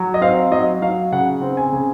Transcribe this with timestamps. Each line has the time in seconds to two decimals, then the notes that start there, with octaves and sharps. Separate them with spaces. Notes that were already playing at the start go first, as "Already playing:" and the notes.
Already playing: F#3
0.14 D#5
0.21 C4 F5
0.51 F#3 D#5
0.82 F#3 F5
1.12 C#3 F#5
1.42 C4
1.57 G#5
1.73 C#3